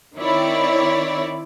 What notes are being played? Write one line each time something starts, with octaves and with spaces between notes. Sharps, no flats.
D#3 C4 E4 C#5 D5